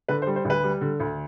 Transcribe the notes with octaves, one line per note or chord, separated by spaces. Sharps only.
D3 B4
C5
G3
C5
D2
B4
G3
D3
D2